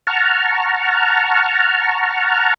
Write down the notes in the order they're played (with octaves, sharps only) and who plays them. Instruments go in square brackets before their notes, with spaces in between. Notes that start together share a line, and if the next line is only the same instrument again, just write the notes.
[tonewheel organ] F#5 A5 A#5 C#6 F6